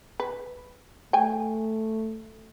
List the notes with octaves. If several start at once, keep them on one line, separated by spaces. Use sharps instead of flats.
B4
A3 G5 G#5